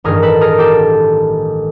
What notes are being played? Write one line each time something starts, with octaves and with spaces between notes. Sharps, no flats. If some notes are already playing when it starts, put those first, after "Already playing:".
A1 G2 D#3 G#4 A#4
A4 B4
G#4 A#4
G4 A4